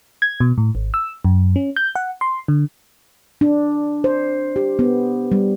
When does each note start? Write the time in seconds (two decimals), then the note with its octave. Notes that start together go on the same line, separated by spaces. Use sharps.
0.22 G#6
0.40 B2
0.58 A2
0.75 G#1
0.94 E6
1.25 F#2
1.56 C#4
1.76 G6
1.95 F#5
2.21 C6
2.48 D3
3.41 D4
4.04 C5
4.56 G4
4.79 B3
5.32 G3